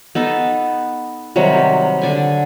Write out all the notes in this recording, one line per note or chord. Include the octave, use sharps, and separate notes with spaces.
B3 D#4 A4
C3 D#3 F#3 G3
D3 D5 G#5